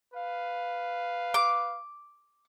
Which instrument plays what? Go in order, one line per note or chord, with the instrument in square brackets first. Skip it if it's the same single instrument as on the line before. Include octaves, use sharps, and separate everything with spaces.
[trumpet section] B4 F5
[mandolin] D6